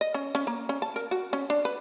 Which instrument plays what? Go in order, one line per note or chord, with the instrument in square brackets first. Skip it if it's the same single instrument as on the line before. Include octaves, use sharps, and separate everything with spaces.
[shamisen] D#5
C#4
C#4
A#3
C#4
A5
A#4
F#4
C#4
D4
B4